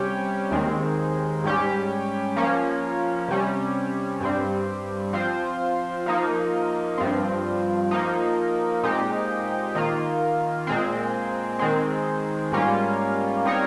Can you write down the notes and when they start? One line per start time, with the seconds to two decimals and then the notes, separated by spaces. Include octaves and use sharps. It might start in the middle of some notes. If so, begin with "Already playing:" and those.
Already playing: C3 G3 C#4 G4
0.51 D#2 D#3 G#3 C4
1.44 G#2 G3 C#4 G4
2.36 F3 A#3 C#4
3.28 C3 G3 C#4
4.21 G2 G3 C4
5.13 F3 C4 F4 C5
6.06 F3 A#3 D#4
6.98 G2 F3 C4
7.91 F3 A#3 D#4
8.83 A#2 G#3 C4 D#4 G4
9.75 D#3 A#3 F4
10.67 A#2 G#3 C4
11.59 D#3 G#3 C4
12.52 G#2 G3 A#3 C#4 F4
13.45 G3 C4 D#4 A#4 C#5